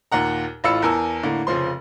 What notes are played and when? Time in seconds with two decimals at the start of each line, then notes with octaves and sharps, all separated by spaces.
0.12 D#2 A#2 F#5 A#5
0.64 A1 A2 F4 B5 E6 C#7
0.82 E2 A#4 G#5 A5 E6
1.23 A2 D3 A#3
1.47 F1 C#3 F3 C6